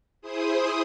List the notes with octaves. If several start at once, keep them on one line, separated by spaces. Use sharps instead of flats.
E4 G#4 C5 D#6